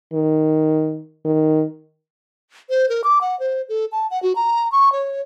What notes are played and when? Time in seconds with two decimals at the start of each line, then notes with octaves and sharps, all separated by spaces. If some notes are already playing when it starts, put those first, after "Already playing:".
0.13 D#3
1.25 D#3
2.70 C5
2.89 A#4
3.04 D6
3.21 F#5
3.40 C5
3.69 A4
3.92 A5
4.11 F#5
4.23 F#4
4.36 A#5
4.72 C#6
4.92 C#5